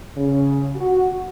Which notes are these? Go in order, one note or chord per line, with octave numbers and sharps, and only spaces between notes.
C#3
F#4